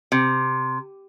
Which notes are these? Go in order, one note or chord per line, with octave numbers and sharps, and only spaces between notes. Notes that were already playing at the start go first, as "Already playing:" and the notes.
C3